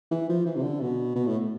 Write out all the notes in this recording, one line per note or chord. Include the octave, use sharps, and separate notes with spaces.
E3
F3
E3
C3
D3
B2
B2
A2